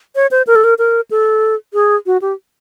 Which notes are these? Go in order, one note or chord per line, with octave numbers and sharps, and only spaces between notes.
C#5
C5
A#4
A4
A#4
A#4
A4
G#4
F#4
G4